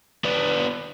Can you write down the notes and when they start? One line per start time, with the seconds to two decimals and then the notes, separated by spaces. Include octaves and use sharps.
0.25 B3 D4